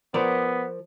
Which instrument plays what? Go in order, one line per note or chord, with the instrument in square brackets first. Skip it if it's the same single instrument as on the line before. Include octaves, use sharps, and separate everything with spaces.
[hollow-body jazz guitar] F3 A#4 D5 [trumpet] B3